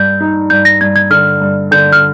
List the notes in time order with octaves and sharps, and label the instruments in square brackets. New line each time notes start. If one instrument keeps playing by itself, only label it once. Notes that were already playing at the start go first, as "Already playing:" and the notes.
Already playing: [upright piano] G2 [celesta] G6
[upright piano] D#4
[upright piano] G2 [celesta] G6
[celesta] A#6
[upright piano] G2 [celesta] G#6
[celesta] G#6
[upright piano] D3 [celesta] F6
[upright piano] G2
[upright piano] D3 [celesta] G6
[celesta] F6